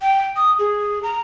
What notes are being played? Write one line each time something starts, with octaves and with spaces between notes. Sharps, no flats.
G5
D#6
G#4
A#5